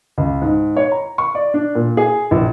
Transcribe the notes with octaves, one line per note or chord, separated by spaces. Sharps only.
C#2
G#2
C#5
A#5
C#6
D5
D4
A#2
G#4
A#1